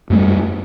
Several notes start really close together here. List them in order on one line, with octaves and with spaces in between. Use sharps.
F#2 A3 G3